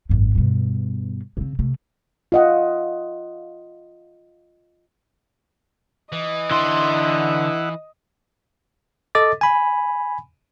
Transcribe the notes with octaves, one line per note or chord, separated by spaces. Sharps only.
G#1 F#2
G2 B2
C#3 C4
C3 A3
F4 D#5 F#5
E3 D#5
D3 E4 F#5 C6
A4 D#5 D6 A6
G#5 B5